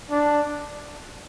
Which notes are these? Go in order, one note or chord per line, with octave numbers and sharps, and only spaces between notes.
D4